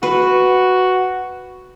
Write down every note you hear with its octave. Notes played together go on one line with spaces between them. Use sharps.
F#4 B4